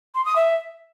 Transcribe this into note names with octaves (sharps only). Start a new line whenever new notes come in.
C6
D#6
E5